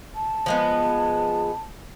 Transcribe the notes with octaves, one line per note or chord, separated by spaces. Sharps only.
A5
F3 G#3 B3